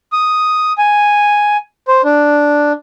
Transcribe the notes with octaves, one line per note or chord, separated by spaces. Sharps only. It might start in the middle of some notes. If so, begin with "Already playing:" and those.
D#6
G#5
C5
D4